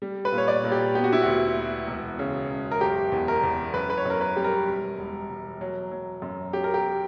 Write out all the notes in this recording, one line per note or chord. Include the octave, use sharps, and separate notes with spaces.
G3
B4
A#2
C#5
D5
A#2
G4
B3 G4
F#4
E4
D2 F#4
B3
E1
C#3
E1
A#4
F#1 G4
E2
A#4
E2
F#2 B4
B4
C#5
F#2 A#4
B4
G3 G4
A#4
E1
E1
E1
F#3
F#3
F#2
F#3 G4
A#4
G4